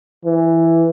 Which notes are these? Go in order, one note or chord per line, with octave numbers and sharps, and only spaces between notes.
E3